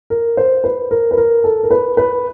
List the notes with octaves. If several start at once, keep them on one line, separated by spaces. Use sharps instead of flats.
A#4
C5
B4
A#4
B4
A#4
A4
A#4
B4
B4